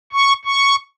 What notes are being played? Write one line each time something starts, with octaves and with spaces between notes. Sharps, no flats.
C#6
C#6